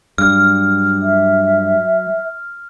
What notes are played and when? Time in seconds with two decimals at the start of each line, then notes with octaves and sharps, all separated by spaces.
0.18 G2 F#3 F6
1.02 E5